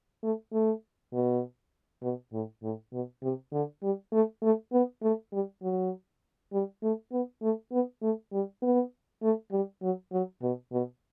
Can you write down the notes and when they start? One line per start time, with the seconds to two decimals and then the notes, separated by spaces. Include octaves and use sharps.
0.23 A3
0.53 A3
1.13 B2
2.03 B2
2.33 A2
2.63 A2
2.93 B2
3.23 C3
3.53 D3
3.83 G3
4.13 A3
4.43 A3
4.73 B3
5.03 A3
5.33 G3
5.63 F#3
6.53 G3
6.83 A3
7.12 B3
7.42 A3
7.72 B3
8.02 A3
8.33 G3
8.62 B3
9.23 A3
9.52 G3
9.83 F#3
10.12 F#3
10.42 B2
10.72 B2